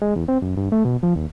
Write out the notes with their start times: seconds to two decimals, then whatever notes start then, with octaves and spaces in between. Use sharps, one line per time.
0.01 G#3
0.16 E2
0.28 C4
0.42 F#2
0.57 G2
0.72 A3
0.85 B2
1.03 F3
1.16 D#2